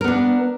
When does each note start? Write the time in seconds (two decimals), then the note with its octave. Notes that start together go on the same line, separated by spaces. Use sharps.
0.01 A#4
0.04 B3
0.08 D4